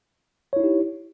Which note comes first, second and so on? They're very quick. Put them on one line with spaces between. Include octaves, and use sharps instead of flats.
C#5 E4 D#4 G4